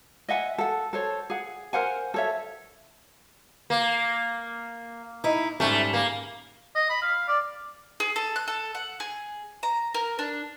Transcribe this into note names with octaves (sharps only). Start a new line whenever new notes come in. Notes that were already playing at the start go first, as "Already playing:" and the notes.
D#5 E5 F#5 G#5
A4 F#5
A4 C5 C#5
G#4 F#5
A#4 C5 F#5 G#5
A4 C#5 E5
A#3
D#4 E4
G#2 G3 A3 C#4
A#3
D#5
B5
F5
D5
G#4
A4
F#6
A4
F#5
G#4
A#5
A#4
D4